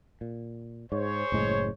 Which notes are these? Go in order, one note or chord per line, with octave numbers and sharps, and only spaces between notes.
A#2
G#2 G#4 C5 C#5
F#1 A2 G#3